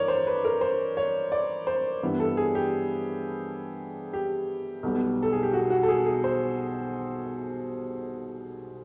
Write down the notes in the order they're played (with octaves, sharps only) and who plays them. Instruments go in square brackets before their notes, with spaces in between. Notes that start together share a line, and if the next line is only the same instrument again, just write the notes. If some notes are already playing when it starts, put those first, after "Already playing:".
Already playing: [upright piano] G2 E3 A#4 C#5 D5
C5
B4
A#4
C5
C#5
D5
C5
G2 E3 G3 B3
A4
G#4
G4
G4
B1 B2 G3 B3
A4
G#4
G4
F#4
F#4
A4
G#4
G#4
C5